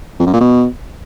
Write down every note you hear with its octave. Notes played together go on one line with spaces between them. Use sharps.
F2
F#2
A#2
B2